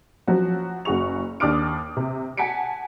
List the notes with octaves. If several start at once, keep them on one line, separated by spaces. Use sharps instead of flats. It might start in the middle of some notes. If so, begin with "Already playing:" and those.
F3 F#3 C#4 F#4
F#1 F#4 G#4 C#6 F7
D#2 D4 D6 D#6 F6 D7
C3
F#5 G#5 A5 B6 C#7 D7